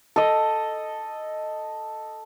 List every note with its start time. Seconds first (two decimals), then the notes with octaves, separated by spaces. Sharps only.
0.16 A4 D#5